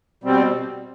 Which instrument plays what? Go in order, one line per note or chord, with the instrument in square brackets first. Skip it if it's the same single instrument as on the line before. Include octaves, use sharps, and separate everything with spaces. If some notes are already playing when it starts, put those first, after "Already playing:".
[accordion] B2 G3 C4